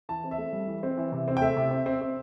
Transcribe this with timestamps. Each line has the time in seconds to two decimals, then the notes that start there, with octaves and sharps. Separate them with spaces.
0.09 E3 A5
0.24 C4
0.31 E5
0.38 A3
0.53 G3
0.67 E3
0.83 C4
0.97 E3
1.12 C3
1.28 C4
1.37 G5
1.41 A3 E5
1.56 C3
1.71 C4
1.86 C4
2.01 C4